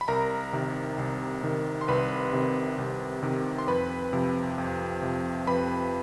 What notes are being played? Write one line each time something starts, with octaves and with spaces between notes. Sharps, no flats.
B5
C2 A#4 A#5
C3 D#3
C2
C3 D#3
C6
C2 B4 B5
C3 D#3
C2
C3 D#3
C6
F2 B4 B5
C3 F3
F2
C3 F3
F2 B4 B5